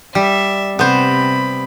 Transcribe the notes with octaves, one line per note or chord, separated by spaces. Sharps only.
G3 E5
C3 B3 C5 B5